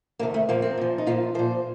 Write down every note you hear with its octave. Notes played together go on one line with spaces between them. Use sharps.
F2 C3 D#3 A#3
A3
A#2 F3 A#3
C4
A#2 F3
D#4
A#2 F3 F4
A#2 F3 C5